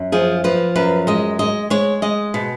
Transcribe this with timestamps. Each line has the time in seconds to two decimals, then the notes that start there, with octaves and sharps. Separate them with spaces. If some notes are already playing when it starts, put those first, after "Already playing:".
Already playing: F#2
0.12 F3 G#4
0.44 F3 B4
0.76 F#2 B4
1.07 G#3 D#5
1.39 G#3 D#5
1.70 G#3 C#5
2.02 G#3 D#5
2.34 B2